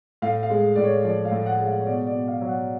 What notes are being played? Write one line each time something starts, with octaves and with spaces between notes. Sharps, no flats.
A2 F5
F5
G#3
A2 D5
C#5
F3 D5
F5
A2
F#5
G#3
F5
C#5
B2 D5
D5
B2
F5
F#3
F#5